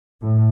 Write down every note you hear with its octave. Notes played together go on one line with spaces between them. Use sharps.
A2